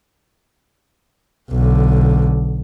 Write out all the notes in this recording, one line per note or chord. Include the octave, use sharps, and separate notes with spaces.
B1 D3